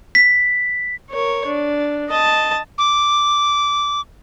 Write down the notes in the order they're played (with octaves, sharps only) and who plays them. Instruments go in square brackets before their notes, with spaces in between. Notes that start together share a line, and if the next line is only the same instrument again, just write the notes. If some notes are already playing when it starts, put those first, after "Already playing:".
[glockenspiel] B6
[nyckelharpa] A#4 C#5
D4
D#5 A5
[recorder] D6